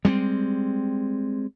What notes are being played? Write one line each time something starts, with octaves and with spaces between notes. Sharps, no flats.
G3 G#3 B3 C4